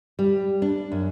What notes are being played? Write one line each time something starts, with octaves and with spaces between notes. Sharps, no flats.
G3
D4
F#2